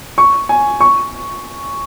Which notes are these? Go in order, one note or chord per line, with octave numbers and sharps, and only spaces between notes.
C#6
G#5
C#6